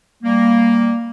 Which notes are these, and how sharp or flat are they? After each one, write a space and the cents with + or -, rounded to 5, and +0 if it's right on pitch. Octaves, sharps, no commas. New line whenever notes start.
G3 +5 A#3 +0